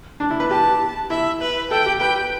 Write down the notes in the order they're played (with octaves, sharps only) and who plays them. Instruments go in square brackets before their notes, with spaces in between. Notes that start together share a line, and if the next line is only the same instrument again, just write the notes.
[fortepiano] D4
E4
B4
[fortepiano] G4 [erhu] A5
[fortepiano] E4 [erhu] E5
[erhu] B4
[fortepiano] A4 [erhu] G5
[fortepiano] G4
[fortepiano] B4 [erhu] G5